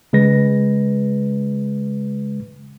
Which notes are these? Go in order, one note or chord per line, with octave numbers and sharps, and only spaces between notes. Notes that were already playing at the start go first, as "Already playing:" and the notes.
C#3 G#3 B4 A#6